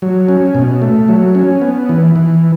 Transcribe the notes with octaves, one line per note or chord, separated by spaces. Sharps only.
F#3
C#4
B2
A3
F#3
C#4
B3
E3
E3